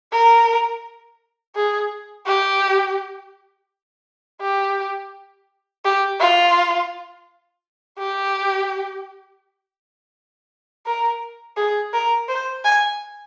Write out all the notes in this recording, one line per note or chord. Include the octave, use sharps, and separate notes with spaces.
A#4
G#4
G4
G4
G4
F4
G4
A#4
G#4
A#4
C5
G#5